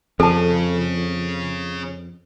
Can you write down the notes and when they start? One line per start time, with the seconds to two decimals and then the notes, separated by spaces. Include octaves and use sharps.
0.20 F2 C#4 G#4 A4 A5